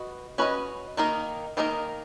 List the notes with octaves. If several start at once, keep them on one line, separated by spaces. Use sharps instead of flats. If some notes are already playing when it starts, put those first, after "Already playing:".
Already playing: F#4 B4 D#5
C#4 F#4 B4 D#5
D#3 A#3 D#4 A#4 D#5
D#3 A#3 D#4 A#4 D#5